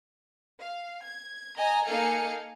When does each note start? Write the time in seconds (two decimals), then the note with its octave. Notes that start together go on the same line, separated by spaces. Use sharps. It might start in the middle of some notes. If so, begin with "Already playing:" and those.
0.60 F5
1.03 G#6
1.57 D#5 G#5 A#5
1.86 A#3 D#4 A4 F5 G#5 C#7